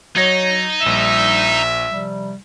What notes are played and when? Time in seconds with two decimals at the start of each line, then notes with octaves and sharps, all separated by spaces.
0.16 F#3 D#4 C#5 G#6 A#6
0.82 A#1 G3 E5 E6 E7
1.88 C3 F3 G3